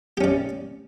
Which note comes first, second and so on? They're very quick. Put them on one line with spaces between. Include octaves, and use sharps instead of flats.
G4 C#4 D5